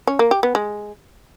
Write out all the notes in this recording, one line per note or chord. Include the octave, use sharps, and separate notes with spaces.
C#4
A#3
G4
B3
G#3